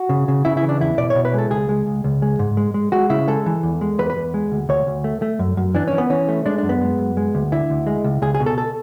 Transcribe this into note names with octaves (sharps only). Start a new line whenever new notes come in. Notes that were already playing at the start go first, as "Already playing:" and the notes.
Already playing: F#4
C#3
C#3
C#3 E4
E4
E3
D4
E2 E4
B2 D5
C#5
B2
B4
G#3 A4
C#2 G#4
G#3
C#2
C#2
G#3
G#2
G#3
G#3
G#3 F#4
C#3 E4
G#3 A4
E3
E2
G#3
E2 B4
B4
E2
G#3
D2
D2 C#5
D2
A3
A3
F#2
F#2
E3 D4
C#4
E3
B3
E3 C#4
A3
G#3 D4
F#2 D4
B3
G#3
F#2
G#3
D2
D3 E4
D2
G#3
C#2
C#2 G#4
G#4
B2
A4
A4